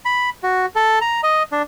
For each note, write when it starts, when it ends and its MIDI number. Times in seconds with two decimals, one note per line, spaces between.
0.05 0.30 83
0.43 0.66 66
0.76 0.99 69
1.01 1.21 82
1.23 1.43 75
1.52 1.62 62